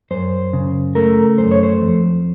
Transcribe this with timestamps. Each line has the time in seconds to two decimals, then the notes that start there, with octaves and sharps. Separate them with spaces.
0.11 F#2 C5
0.53 C#3
0.95 A3 A#4
1.38 F#2 C5
1.51 C#5
1.63 C5
1.81 F2